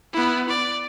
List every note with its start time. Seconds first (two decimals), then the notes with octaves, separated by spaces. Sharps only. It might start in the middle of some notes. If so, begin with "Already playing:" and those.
0.13 B3 E4
0.49 D5